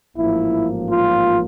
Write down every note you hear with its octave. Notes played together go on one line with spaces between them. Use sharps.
A1 G#2 F3 A#3 E4
F4